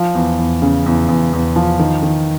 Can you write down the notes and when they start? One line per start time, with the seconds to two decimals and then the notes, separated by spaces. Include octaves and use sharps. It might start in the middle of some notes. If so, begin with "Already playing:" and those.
Already playing: F3
0.15 E2
0.39 E2
0.62 C#3
0.86 E2
1.09 E2
1.33 E2
1.56 F3
1.79 D#3
2.03 D#3